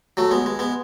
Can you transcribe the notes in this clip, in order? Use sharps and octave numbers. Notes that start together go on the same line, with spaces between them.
F#3 A3
G#3 B3
G#3
G#3 B3